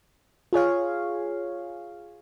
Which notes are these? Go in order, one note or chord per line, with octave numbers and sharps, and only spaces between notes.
F4 G#4 C#5 F5